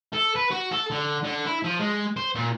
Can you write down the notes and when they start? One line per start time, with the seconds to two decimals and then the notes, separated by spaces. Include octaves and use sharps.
0.14 A4
0.36 B4
0.51 F#4
0.72 A4
0.90 D3
1.24 D3
1.46 E4
1.64 F3
1.79 G#3
2.17 C5
2.35 A#2